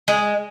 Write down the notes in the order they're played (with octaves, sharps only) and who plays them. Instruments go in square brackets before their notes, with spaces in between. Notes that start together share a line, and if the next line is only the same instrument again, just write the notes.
[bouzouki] G#3